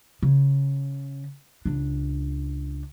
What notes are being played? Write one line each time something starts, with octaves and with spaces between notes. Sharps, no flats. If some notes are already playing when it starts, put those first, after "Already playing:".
C#3
C#2 D4